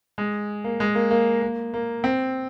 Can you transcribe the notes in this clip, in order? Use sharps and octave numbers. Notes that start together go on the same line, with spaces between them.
G#3
A#3
G#3
A#3
A#3
A#3
A#3
C4